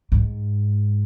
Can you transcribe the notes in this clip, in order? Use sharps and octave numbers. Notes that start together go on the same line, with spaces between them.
G#2